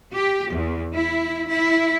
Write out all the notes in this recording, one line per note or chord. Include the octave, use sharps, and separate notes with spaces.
G4
E2
E4
E4